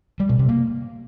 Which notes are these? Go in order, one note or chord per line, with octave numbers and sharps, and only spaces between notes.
G3
B2
C3
A#3